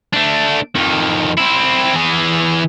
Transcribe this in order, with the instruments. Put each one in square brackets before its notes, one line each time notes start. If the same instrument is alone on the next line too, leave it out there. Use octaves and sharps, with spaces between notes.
[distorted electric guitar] A3 D4
F2 D#3
C4 E4
E3 G#4